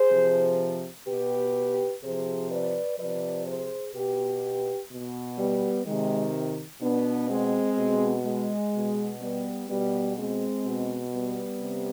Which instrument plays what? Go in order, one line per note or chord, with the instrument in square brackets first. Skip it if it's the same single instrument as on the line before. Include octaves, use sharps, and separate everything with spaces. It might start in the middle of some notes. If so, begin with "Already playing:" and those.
Already playing: [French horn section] G#4 C5
C3 F3
B2 G4 B4
C3 F3 G#4 C5
B4 D5
C3 F3 B4 D5
G#4 C5
B2 G4 B4
B2
G3 B3
C3 D#3 G#3
B2 B3 D4
G#3 C4
B2
G#3
B2
G3 B3
B2 G3 B3
G#3 C4
B2
G3 B3
C3